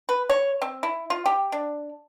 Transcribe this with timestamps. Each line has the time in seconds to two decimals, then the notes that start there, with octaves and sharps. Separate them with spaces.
0.09 B4
0.30 C#5
0.62 C4
0.83 E4
1.10 F4
1.26 G4
1.52 D4